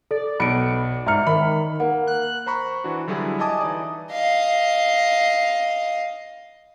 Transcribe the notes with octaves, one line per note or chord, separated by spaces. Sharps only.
A4 D5
B1 B5 C#7 D7
G#2 E5 A#5 F6 C#7
D#3 B5
A#3 F#5
F#6
C5 A#5 B5 C#6
E3 D4 F#4
D3 F#3 G3 E4 G#4
D#5 E5 G#5 A5 D6 D#6
E3 D#4 D5
D#5 F5